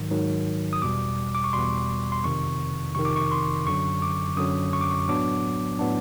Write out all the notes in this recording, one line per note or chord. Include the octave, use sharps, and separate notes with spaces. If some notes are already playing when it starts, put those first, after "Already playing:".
Already playing: G#2 D#3 F#3
G#2 D#3 F#3
D#6
E2 B2 G3 D6
D6
C#6
E2 B2 G3 C6
C6
F2 C3 D#3 C#6
F2 C3 D#3 C#6
D6
C#6
C6
F#2 D3 F#3 C#6
D6
F#2 D3 F#3 D#6
C#6
D6
C#6
A2 F#3 B3 D4 D6
A2 F#3 B3 D4